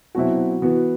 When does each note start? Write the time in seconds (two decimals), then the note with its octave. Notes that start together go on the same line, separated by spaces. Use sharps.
0.15 B2 F#3 C4 E4 F#4
0.62 E3 B3 F#4